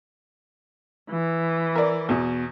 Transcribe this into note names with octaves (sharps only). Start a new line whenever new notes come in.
E3
A#4 D5
E2 B2